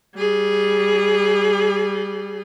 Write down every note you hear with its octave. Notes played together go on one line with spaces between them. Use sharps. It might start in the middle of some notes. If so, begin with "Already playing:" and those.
G3 G#4